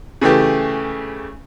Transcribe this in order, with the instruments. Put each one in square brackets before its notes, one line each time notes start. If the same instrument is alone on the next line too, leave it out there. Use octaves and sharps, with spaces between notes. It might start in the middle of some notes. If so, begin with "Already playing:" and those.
[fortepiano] C#3 E3 A3 G4